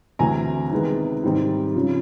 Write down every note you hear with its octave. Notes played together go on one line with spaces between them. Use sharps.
D2 C3 E3 G#5 A#5
C3 D#3 G#3 B3
G#2 D#3 G3 C4 D#4
C#3 F3